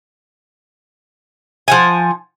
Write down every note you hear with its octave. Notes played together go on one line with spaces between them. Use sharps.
F3 F#5 G#5